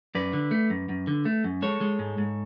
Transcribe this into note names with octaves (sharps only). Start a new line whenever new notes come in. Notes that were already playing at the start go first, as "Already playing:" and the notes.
F#2 B4 D5
D3
A3
F#2
F#2
D3
A3
F#2
G#3 A4 C#5
G#3
G#2
G#2